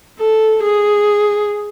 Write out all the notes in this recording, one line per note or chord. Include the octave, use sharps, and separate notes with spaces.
A4
G#4